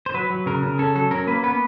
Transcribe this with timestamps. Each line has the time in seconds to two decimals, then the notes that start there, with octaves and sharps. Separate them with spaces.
0.06 C5
0.14 F#3 B4
0.30 F#3
0.46 C#3 A#4
0.63 C#3
0.79 C#4 A4
0.95 F#3 A4
1.11 C#4 A#4
1.27 A#3 B4
1.43 B3 B4